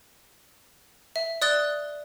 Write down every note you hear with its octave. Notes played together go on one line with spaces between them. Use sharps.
E5
D5 D#6 F#6 A6 G7